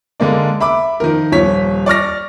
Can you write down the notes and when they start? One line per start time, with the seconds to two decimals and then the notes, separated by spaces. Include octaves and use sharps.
0.20 D3 G#3 A#3 D4
0.60 E5 B5 D6
1.00 D#3 F3 A#4
1.32 D#1 F3 C#5 B6
1.86 D5 C#6 F6 A#6